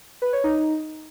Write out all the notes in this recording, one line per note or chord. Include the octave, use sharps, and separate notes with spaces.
B4
C#5
D#4